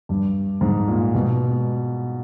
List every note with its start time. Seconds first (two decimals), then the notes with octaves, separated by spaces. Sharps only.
0.09 G2
0.61 G#2
0.88 A#2
1.14 B2